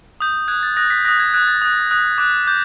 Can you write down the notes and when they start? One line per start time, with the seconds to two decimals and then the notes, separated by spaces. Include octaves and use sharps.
0.20 D#6 G6
0.48 D#6 F#6 G#6
0.63 A6
0.76 D#6 F#6 A#6
0.90 B6
1.05 D#6 F#6 A#6
1.19 G#6
1.34 D#6 F#6 G#6
1.48 A6
1.62 D#6 F#6
1.91 D#6 F#6
2.18 D6 F#6 G#6
2.47 D6 G6